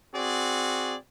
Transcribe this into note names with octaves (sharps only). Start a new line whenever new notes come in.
C4 F#4 G#4 D5